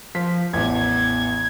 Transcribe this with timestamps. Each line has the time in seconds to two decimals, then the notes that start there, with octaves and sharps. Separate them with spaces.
0.15 F3 B6
0.53 A1 E2 G#6